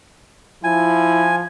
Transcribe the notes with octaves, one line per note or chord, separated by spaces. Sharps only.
F3 E4 G#5